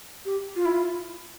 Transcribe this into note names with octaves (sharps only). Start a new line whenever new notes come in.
G4
F4
E4
F4